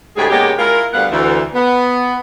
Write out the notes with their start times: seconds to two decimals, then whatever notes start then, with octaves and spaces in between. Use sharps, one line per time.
0.16 D2 A2 G#3 G4 G#4
0.30 A#2 G#3 B3 C#4 G4
0.58 G#3 E4 F4 A#4
0.93 D2 G3 B3 B4 F5 F#5
1.11 D2 E3
1.54 B3